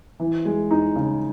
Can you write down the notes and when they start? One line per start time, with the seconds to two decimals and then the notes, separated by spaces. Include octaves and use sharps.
0.20 E3
0.45 G#3
0.71 D#4
0.96 C#3